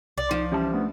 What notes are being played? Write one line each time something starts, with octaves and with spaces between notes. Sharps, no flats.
C2 D5
F3 D#4
E3 G3 C#4 G4 E5 A5
A3 B3 D4